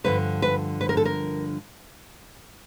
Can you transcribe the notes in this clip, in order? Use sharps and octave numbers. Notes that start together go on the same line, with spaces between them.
G2 D3 F3 B4
B4
B4
A#4
A4
A#4